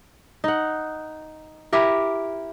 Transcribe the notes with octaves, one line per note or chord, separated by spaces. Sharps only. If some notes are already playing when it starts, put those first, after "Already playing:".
D#4 F#5
E4 G4 A#4